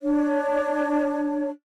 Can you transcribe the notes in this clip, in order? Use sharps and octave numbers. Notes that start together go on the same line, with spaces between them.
D4 C#5